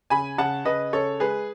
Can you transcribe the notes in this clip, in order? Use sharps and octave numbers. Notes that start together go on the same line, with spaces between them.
C#3 G#5 B5
C#3 F#5 A5
C#3 B4 D#5
C#3 A4 C#5
G#3 G#4 B4